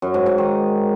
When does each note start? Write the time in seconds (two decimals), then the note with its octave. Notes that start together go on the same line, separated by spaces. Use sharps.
0.02 F#2
0.14 G#2
0.26 G#2
0.38 D#3